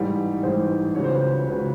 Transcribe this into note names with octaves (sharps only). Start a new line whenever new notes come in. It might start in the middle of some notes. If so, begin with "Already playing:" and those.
Already playing: A1 G#2 E3 G3
A1 G#2 E3 G3 C5
C#2 C#3 F#3 C#5
C5
B4
C5
C#2 C#3 F#3 B4